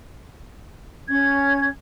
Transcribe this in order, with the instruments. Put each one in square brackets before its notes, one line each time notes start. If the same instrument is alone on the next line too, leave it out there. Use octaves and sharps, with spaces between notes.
[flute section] C#4 G#6